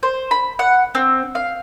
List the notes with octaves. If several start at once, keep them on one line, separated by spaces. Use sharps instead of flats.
C5
B5
F#5
C4
F5